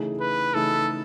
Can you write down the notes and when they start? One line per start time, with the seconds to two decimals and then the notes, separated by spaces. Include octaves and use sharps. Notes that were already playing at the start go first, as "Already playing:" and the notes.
Already playing: C#3 E3 A3 D#4 G#4
0.21 B4
0.54 C#3 E3 A3 D#4 G#4 A4